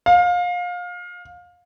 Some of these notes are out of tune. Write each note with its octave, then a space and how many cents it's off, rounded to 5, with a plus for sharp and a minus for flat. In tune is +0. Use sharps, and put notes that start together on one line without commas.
F5 +25